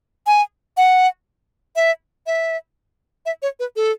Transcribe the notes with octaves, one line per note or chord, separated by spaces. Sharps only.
G#5
F#5
E5
E5
E5
C#5
B4
A4